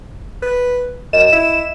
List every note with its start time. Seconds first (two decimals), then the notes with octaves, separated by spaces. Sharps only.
0.42 B4
1.13 F#2 D#5 E7
1.32 E4